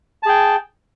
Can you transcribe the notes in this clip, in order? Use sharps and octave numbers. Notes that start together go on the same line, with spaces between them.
G#4 G5 A5